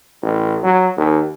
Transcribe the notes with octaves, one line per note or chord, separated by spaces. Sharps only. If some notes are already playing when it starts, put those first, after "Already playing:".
A1
F#3
D#2